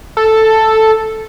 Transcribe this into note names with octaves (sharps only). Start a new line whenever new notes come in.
A4